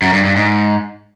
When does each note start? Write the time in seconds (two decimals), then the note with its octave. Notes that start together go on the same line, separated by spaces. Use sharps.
0.02 F#2
0.13 G2
0.25 G2
0.36 G#2